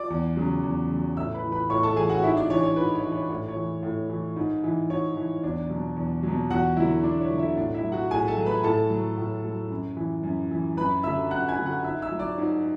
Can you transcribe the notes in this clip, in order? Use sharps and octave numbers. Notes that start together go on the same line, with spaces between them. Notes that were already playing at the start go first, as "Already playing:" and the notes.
Already playing: D5 D6
E2
C#3 F#3
E2
C#3 F#3
A2 E5 E6
B4 B5
E3
B4 B5
A2 C#5 C#6
A4 A5
E3 G#4 G#5
F#4 F#5
G#2 E4 E5
D4 D5
E3 C#5
C#5
G#2 B4
C#5
E3
C#5
A2 C#5
C#5
E3
A2
E3
G#2
E3
G#2 C#5
E3
E2 D4 D5
B2 F#3
E2
B2 F#3
E2 F#4 F#5
D3 F#3 E4 E5
E2 D4 D5
C#5
D3 F#3
E4 E5
A2 D4 D5
E4 E5
F#3
F#4 F#5
A2 G#4 G#5
A4 A5
F#3
B4 B5
A2 A4 A5
F#3
A2
F#3
F#2
E3
F#2
E3
F#2 B4 B5
D3 F#3 E5 E6
F#2 F#5 F#6
G#5 G#6
D3 F#3
F#5 F#6
G#2 E5 E6
E5 E6
F#3
D5 D6
G#2